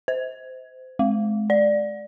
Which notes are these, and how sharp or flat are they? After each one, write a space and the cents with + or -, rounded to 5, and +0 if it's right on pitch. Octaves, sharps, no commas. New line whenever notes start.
C5 -20
G#3 +35
D5 +5